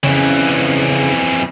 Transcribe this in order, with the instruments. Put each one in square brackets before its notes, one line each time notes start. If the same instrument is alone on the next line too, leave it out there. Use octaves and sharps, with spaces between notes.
[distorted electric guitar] F2 E3 [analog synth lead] C#3